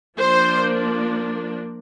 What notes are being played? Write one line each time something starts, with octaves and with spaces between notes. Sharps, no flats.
F3 A#3 D4 C5